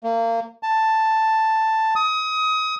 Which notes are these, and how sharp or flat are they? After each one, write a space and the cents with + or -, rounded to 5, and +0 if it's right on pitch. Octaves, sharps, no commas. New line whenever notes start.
A#3 -30
A5 +5
D#6 +25